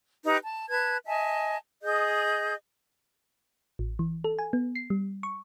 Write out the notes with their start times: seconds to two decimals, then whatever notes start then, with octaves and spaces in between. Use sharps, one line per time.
0.24 D#4 G4 B4 A#5
0.42 A5
0.69 B4 A5 G#6
1.06 D#5 E5 G#5 A5
1.83 G#4 D#5 G6
3.79 A1
3.99 E3
4.24 A4
4.39 G#5
4.53 B3
4.75 C7
4.90 G3
5.23 C#6